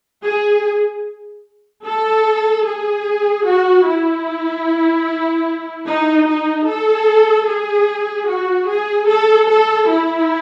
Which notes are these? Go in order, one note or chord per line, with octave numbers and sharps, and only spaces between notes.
G#4
A4
G#4
F#4
E4
D#4
D#4
A4
G#4
F#4
G#4
A4
A4
E4